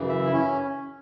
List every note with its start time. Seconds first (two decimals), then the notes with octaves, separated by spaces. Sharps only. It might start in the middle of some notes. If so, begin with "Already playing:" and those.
Already playing: F#2 C#3 E3
0.09 E5
0.26 E4
0.33 C#4